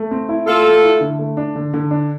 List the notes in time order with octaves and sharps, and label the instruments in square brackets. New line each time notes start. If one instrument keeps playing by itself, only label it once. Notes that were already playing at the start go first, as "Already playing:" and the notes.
Already playing: [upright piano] A3
C4
E4
[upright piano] A3 [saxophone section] F4 A4
[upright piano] A3
E4
D3
A3
D4
D3
D3
D4